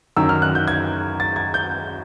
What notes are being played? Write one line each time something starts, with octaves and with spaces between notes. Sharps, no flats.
F#2 D#3 E6
F6
F#6
G6
G#6
A6
G#6
G6